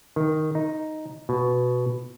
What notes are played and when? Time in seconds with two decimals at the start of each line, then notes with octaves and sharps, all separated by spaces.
0.16 D#3
0.55 D#4
1.29 B2